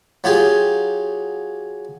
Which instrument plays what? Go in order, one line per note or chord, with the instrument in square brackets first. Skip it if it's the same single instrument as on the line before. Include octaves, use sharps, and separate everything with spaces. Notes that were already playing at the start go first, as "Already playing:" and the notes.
[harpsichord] F#3 F4 G4 G#4